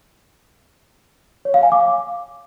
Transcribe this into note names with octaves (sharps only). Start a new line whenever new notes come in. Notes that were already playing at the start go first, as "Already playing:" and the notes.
C#5
F5
G#5
D6